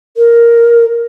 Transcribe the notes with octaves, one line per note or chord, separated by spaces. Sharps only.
A#4